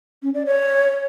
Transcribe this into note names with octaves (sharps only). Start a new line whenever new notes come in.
C#4
D5
C#5